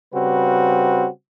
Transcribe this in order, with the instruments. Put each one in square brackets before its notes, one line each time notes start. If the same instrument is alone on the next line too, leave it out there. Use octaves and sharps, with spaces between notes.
[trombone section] C#3 G3 C4 F#4 B4